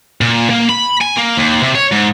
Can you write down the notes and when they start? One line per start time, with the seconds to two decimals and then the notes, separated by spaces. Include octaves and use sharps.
0.21 A#2
0.50 A#3
0.69 B5
1.01 G#5
1.17 A#3
1.37 D#2
1.62 C3
1.75 C#5
1.92 G#2